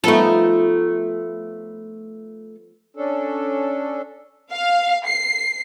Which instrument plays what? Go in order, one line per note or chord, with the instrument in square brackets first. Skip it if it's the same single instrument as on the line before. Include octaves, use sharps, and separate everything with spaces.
[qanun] F3 B3 D#4 [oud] A3 A4
[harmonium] C#4 D4 A4
[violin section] F5
C7